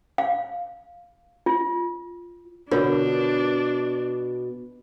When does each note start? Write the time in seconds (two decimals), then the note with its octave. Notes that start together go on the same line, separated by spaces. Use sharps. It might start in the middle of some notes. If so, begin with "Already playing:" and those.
0.18 F5
1.46 F4
2.71 B2 D3 D4 F4 A#4 C#5